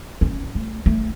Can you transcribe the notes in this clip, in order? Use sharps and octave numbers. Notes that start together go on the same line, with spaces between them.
C#4
A3
A3